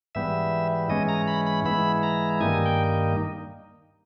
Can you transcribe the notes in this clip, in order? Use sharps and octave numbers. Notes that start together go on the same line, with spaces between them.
G#2 E3 G3 B3 E5
G#2 E3 G#3 C#4 D#5
A#5
B5
B5
G#2 E3 G#3 B3 E4 B5
A#5
G2 D#3 G3 A#3 D#4 G#5
G5